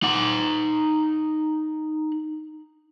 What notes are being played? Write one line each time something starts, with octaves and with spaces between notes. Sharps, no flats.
D#4 F#5